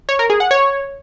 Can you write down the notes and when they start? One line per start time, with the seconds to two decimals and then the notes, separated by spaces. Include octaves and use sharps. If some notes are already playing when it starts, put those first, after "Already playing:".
0.09 C#5
0.19 A#4
0.30 G#4
0.40 F#5
0.51 C#5